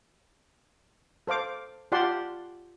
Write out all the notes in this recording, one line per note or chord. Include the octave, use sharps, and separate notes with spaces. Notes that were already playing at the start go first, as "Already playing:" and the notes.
A4 C5 F5 D6
F4 G4 D5 F#5 A5 C6